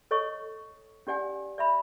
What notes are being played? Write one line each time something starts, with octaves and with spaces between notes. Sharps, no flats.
A4 C#5 D#5 C#6
C#4 G4 D5 F#5 G#5
D5 E5 B5